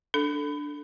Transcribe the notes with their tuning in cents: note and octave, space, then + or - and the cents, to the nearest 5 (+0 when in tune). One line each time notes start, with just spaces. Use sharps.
D4 +0 A4 +0